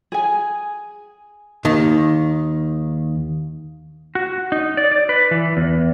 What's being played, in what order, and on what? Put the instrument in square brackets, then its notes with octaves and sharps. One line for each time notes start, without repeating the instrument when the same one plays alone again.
[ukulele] G#4 G#5
[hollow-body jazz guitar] D#2 D#3
[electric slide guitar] F#4
D#4
D5
D5
B4
E3
E2